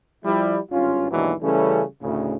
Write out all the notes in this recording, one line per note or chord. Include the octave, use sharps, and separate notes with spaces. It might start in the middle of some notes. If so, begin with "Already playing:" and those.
F3 G3 E4
G#1 G2 C#4 F4
D#2 G#2 B2 E3 F#3 D4
C#3 E3 G3 A3 C#4 A4
D2 A2 C#3